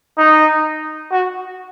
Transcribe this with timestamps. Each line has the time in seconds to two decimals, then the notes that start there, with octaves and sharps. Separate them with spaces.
0.18 D#4
1.12 F#4